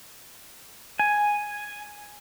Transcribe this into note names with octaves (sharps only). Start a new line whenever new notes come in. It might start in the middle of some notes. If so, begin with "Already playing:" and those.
G#5